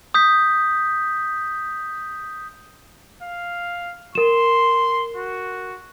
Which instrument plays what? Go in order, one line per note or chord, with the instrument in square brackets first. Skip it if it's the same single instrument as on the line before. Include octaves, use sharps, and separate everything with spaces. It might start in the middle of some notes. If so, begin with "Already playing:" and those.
[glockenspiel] D#6 G6 B6
[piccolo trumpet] F5
[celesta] A#4 E7 [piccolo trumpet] C6
[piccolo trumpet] F#4